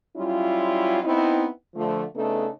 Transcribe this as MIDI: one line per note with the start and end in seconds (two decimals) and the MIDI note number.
0.17 1.00 54
0.17 1.00 55
0.17 1.00 61
0.17 1.00 64
0.17 1.00 65
1.03 1.47 59
1.03 1.47 60
1.03 1.47 63
1.03 1.47 64
1.75 2.03 50
1.75 2.03 53
1.75 2.03 57
2.16 2.48 49
2.16 2.48 57
2.16 2.48 59
2.16 2.48 62
2.16 2.48 63
2.16 2.48 69